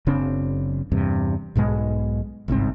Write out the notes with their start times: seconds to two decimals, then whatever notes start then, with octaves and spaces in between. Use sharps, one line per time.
0.07 F#1 C#3 C4 D4
0.92 E2 G2 C3
1.55 B1 G#2 B2 G#3
2.48 G1 C2 G#2 C4